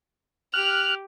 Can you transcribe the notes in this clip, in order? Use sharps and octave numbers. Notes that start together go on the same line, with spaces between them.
G4 F6 F#6 F7